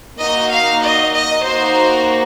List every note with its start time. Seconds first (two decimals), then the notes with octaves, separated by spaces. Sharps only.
0.20 A#3 D#4 F#4 D#5
0.52 F5
0.84 D#5
1.15 D#5
1.46 A#3 D#4 F#4 C5